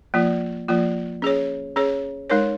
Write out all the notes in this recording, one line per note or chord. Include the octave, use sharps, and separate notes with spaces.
F3 A#3 F4
F3 A#3 F4
C#4 G#4 C#5
C#4 G#4 C#5
G#3 D#4 A#4 C#5